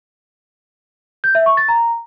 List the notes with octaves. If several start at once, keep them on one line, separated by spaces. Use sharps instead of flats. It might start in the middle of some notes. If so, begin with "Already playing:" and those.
G6
E5
C#6
A6
A#5